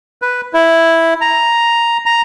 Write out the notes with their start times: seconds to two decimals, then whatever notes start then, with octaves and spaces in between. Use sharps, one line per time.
0.22 B4
0.53 E4
1.21 A#5
2.06 A#5